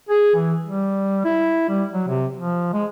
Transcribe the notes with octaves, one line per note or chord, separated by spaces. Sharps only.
G#4
E3
G3
E4
G3
F#3
C3
F3
G#3